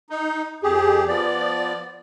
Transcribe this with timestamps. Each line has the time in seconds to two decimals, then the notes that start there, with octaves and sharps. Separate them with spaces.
0.10 D#4
0.63 F2 G4 G#4
1.08 F3 B3 D5